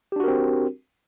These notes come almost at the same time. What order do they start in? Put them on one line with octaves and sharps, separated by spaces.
G4 D4 F#4 A#4 C4